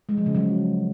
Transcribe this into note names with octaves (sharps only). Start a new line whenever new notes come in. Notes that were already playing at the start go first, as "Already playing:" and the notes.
G#3
F3
C#3
F#3